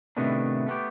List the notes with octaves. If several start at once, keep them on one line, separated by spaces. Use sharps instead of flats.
A2 C3 D#3 A3 B3 D4
A3 B3 G4